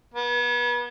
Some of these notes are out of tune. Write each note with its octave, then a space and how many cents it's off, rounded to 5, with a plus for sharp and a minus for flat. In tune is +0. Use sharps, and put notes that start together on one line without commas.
B3 -35